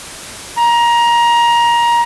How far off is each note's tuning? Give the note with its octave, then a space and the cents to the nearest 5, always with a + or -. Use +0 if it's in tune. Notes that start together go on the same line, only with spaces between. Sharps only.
A#5 +20